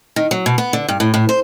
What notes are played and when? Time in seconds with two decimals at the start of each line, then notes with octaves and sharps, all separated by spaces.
0.16 D#3
0.31 F#3
0.46 B2
0.58 B3
0.73 D3
0.88 G2
1.00 A2
1.14 A2
1.29 C5